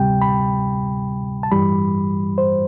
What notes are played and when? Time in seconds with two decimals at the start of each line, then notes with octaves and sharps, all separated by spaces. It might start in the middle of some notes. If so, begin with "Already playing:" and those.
Already playing: D2 C3 G3 G5
0.22 B5
1.43 A5
1.52 G2 E3 G3 B5
2.38 C5